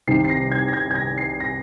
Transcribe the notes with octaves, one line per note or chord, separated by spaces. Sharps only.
C2 C3 D#3 C7
C7
A#6
G#6
A#6
G#6
G#6
A#6
C7
A#6